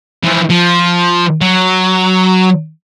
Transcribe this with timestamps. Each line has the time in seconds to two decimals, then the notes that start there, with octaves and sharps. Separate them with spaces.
0.24 E3 F3
0.50 F3
1.41 F#3